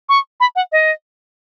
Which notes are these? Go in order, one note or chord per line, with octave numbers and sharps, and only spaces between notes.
C#6
B5
F#5
D#5